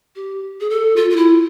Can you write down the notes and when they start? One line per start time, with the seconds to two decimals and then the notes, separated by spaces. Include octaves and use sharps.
0.16 G4
0.60 G#4
0.70 A4
0.96 F4
1.10 F4
1.16 E4